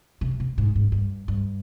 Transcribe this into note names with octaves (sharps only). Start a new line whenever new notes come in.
C3
C3
G#2
G#2
G2
G2